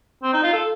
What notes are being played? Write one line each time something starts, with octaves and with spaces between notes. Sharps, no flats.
C4
D#4
F4
A4